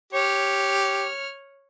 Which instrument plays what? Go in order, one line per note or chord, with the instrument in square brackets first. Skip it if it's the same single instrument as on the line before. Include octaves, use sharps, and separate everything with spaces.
[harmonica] G4 [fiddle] C#5 F6